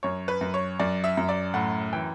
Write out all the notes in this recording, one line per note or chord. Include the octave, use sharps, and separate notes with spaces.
F#2 C#5
B4
F#2
C#5
F#2 D5
E5
F#2
D5
A2 F#5
E3 G5